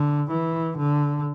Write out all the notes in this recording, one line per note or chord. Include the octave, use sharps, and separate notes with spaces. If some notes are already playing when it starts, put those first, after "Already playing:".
Already playing: D3
E3
D3